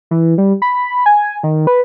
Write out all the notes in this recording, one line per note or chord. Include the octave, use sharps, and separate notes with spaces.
E3
G3
B5
G#5
D#3
B4